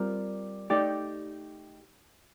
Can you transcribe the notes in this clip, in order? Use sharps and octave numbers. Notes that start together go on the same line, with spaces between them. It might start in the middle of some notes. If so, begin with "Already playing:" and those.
Already playing: G3 C4 F4 A#4
A3 D#4 G4 D5